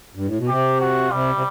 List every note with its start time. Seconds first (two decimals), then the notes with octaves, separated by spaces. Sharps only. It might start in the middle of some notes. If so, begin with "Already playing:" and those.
0.15 G2
0.26 A2
0.38 B2
0.48 C3 G4
0.80 F#4
1.11 C3 G3
1.35 C3